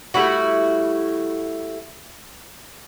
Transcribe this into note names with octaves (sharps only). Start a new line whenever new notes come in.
G3 A3 E4 F#4